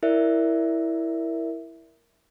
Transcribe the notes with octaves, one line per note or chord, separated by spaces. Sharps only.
E4 A#4 D5 E5